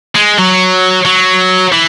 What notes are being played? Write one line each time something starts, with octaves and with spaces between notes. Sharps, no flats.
G#3
F#3
F#3
E3